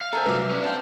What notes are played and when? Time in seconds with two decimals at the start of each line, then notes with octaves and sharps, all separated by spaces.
0.01 F5
0.13 A4 C5 E5 F5 G#5 A#5
0.26 C2 F#3 B4 D6
0.51 C#4 D4
0.63 C4 F5 G5 A5